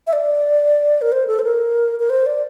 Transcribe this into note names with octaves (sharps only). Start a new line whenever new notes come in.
E5
D5
A#4
C5
A4
C5
A#4
A#4
C5
D5